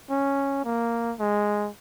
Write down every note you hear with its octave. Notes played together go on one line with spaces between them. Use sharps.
C#4
A#3
G#3